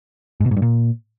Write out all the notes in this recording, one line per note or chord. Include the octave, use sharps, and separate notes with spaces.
G#2
B2
G#2
G2
A#2